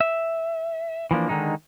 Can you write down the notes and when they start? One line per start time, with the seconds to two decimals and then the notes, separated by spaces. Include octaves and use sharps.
0.01 E5
1.11 E3 F3 A#3 D4
1.29 D3 D#3 G#3 D#4